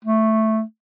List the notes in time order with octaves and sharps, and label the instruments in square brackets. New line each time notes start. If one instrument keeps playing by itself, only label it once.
[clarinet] A3